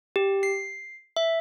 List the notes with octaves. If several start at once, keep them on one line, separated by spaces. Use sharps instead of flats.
G4
C7
E5